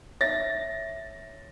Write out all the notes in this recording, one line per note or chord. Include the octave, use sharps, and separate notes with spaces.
C#5 E5 A6 A#6